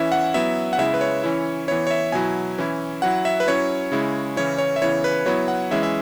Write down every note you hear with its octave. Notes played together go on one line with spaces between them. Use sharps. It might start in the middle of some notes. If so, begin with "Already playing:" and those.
Already playing: E3 C#4 E4 E5
F#5
F#3 B3 E4 E5
F#5
C#3 G#3 E4 E5
B4
C#5
E3 C#4 E4
E3 B3 E4 C#5
C#5
E5
B2 F#3 E4 G#5
E3 C#4 E4
F#3 E4 F#5
E5
B4
F#3 C#4 E4 C#5
C#3 G#3 E4
C#3 E3 C#4 E4 C#5
C#5
E5
C#3 E3 B3 E4 C#5
B4
F#3 B3 E4 C#5
F#5
E3 G#3 C#4 E4 E5
E5